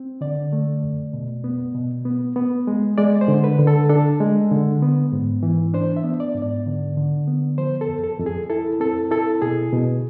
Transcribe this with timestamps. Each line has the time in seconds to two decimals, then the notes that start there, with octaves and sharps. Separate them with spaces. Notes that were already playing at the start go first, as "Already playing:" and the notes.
Already playing: C4
0.21 D3 D5
0.53 A3
0.83 F2
1.13 B2
1.44 B3
1.75 B2
2.05 B3
2.36 B3
2.67 G#3
2.98 G#3 D5
3.21 C5
3.28 D3
3.44 B4
3.59 D3
3.67 A4
3.90 D4 A4
4.20 G#3
4.51 D3
4.82 B3
5.12 G#2
5.43 E3
5.74 D4 C5
5.97 E5
6.04 B3
6.20 D5
6.35 G#2
6.42 D5
6.66 D3
6.97 D3
7.28 B3
7.58 F3 C5
7.81 A4
7.89 F2
8.04 A4
8.19 F2
8.26 G#4
8.50 E4 A4
8.80 C4 A4
9.11 E4 A4
9.42 B2 G#4
9.73 B2